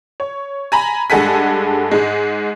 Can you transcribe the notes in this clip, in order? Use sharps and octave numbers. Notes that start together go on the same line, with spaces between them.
C#5
G#5 A#5 B5
G2 G#3 A4 F#5 G#5 B6
G#2 G#3